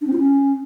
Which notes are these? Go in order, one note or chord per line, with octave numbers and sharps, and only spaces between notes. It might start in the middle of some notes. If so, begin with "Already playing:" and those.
D4
C4
F4
C#4